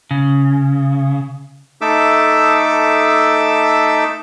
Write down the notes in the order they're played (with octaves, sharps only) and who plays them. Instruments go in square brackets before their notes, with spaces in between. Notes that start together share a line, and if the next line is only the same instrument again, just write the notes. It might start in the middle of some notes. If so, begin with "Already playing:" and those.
[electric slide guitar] C#3
[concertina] A3 D#4 A4 E5 D6 E6